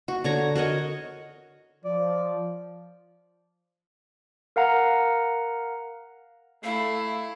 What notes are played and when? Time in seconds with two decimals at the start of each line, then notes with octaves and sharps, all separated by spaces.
0.08 F#4
0.24 D3 C#5 A#5
0.55 F#4 A#4 C#5 D#5
1.85 F3 D5
4.56 A#4 F5 F#5 A#5
6.64 A3 E4 F5